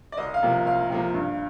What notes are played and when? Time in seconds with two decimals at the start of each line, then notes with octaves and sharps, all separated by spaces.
0.12 D5
0.17 C2 D#5
0.34 F5
0.43 C3 F3 A#3
0.66 C2 F5
0.90 C3 F3 A#3
1.14 G2